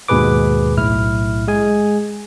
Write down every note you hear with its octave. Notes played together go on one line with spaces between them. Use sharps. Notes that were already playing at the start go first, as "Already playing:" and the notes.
D#2 G#2 B2 G#4 B4 D6
B1 A2 E4 F6
G#3 G#4 G#5